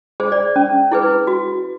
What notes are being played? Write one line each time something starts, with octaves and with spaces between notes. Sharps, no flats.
G#4 C5
D5
C#4
E4 G#4 B4
F#4